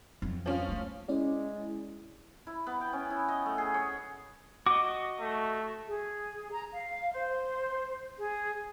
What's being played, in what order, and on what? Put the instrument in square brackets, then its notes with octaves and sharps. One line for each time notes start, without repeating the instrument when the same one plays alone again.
[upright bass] F2 F#3
[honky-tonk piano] F3 C#4 F4
[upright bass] G#3 A3
[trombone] G#3 [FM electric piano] C#4 E4 D5
[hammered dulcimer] E4
B3
G5
C#4
E4
D#5
A3
G#4
C#5
[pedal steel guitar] F#4 D#5 [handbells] D6
[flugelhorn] A3
[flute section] G#4
A#5
F5
C5
G#4